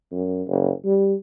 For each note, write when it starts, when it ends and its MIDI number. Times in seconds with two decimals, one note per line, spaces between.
0.12 0.42 42
0.47 0.71 30
0.85 1.14 55